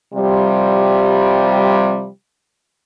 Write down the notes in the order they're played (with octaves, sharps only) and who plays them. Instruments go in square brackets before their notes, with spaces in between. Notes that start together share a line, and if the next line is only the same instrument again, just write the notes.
[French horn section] C3 F3 G3